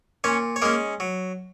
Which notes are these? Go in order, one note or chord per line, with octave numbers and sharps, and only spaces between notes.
A#2 C#4 C#5
C#5
G#3 A#3 C#4 A#4
F#3